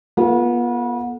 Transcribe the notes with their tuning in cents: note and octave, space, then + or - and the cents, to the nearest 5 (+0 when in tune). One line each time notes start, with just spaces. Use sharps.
B3 -35 F4 +0 A4 +0